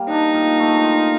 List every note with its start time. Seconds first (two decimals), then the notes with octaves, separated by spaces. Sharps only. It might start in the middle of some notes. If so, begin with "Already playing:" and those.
Already playing: G3 A#3
0.09 D4 D#4
0.34 A#2
0.60 A3
0.84 F4